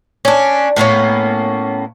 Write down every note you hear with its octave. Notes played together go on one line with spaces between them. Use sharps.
C#4 D4
A2 A#3 B3 C#4